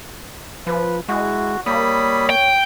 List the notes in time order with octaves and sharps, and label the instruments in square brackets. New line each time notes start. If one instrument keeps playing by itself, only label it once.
[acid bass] F3 [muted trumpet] B4
[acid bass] G#3 [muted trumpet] E4 [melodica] F#4
[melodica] G3 B5 D#6 [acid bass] A#3 [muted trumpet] C#5
[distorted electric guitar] G5